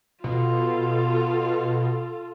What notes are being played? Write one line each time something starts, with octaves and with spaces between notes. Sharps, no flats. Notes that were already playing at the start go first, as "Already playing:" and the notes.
B2 F4 A4